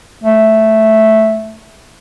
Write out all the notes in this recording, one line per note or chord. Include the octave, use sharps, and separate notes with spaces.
A3